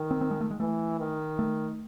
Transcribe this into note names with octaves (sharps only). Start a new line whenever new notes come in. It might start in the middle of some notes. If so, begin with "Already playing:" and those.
Already playing: D#3
C4
C4
G#3
A3
G#3
E3 A3
D#3
A3